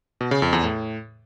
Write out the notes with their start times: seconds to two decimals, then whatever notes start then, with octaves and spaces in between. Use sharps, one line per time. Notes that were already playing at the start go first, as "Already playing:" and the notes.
0.21 B2
0.31 C#3
0.42 F2
0.53 E2
0.63 A2